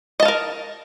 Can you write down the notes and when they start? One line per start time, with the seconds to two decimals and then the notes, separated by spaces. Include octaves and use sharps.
0.20 D#5
0.22 A5
0.25 F5
0.28 A#4